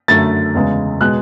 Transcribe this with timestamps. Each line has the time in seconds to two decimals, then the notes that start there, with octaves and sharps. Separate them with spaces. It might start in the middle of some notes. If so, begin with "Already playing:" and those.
0.08 F#2 D3 A3 A6
0.55 E2 C#3 G#3
1.01 B2 G#3 F#6